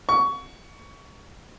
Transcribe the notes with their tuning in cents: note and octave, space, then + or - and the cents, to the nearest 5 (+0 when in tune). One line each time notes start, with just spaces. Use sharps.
C#6 +20